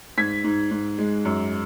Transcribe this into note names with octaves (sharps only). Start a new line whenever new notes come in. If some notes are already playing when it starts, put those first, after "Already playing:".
G#2 G#6 B6
G#2
G#2
G#3
F#2